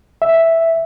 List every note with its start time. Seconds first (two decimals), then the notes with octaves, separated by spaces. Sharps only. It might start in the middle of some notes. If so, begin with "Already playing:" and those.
0.22 E5